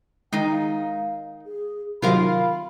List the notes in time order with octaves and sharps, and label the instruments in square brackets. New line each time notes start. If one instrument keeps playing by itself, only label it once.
[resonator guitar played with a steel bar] D#3 D#4 [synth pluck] G#3 [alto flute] G5
[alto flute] F5
G#4
[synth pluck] C3 D#3 F#3 [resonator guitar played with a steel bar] F4 A#4 F5 [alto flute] B5